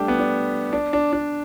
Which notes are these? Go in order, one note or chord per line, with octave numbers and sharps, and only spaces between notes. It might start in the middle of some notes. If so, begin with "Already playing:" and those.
Already playing: G3 A3 D4 G4
B3
D4
D4
D4
D4